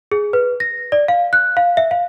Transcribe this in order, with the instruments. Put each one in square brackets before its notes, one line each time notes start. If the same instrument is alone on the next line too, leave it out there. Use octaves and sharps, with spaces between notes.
[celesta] G#4
B4
A#6
D5
F5
F#6
F5
E5
F5